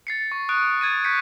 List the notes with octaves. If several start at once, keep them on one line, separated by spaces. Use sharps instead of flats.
A6 C7 C#7
C#6
C#6 D#6 F#6 D7
G#6 A6 D#7
C#6 G6 B6 C#7